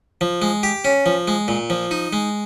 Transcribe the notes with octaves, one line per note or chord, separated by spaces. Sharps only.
F3
G#3
G4
C#4
F3
G#3
A#2
F3
D#4
G#3